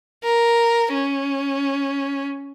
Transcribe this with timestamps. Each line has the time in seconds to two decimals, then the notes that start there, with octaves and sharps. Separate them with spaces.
0.23 A#4
0.94 C#4